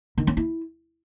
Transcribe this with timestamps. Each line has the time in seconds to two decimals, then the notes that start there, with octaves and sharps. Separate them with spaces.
0.18 D#3
0.27 C#4
0.37 E4